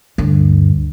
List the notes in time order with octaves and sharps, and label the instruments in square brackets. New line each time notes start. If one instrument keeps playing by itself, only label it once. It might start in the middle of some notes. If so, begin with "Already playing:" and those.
[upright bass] D2 G2